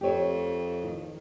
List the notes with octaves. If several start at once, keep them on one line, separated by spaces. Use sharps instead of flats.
F2 G4 C#5
D#3